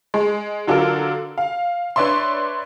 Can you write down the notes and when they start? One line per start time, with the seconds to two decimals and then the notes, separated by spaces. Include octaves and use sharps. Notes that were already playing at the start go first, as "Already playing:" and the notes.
0.14 G#3
0.67 D3 F#3 D4 F4 A4 A#4
1.38 F5
1.96 D4 B4 C#5 D5 E5 C6